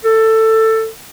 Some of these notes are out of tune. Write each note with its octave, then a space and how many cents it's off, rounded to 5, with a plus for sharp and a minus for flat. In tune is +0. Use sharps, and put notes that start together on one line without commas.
A4 +15